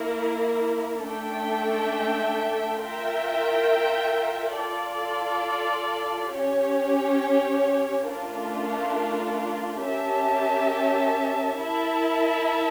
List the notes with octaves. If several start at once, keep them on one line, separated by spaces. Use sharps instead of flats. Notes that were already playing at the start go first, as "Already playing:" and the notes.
Already playing: A#3 E4 A#4
A3 D4 A4 E5 G5
F4 A#4 E5 G5
F4 A4 D5
C#4 G4 C#5
A3 D4 F4 A#4
C#4 G4 A#4 E5 A5
E4 A#4 E5 A5